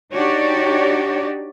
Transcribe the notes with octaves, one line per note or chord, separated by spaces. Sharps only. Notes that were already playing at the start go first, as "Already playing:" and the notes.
D4 D#4 F#4 G4 C#5 D5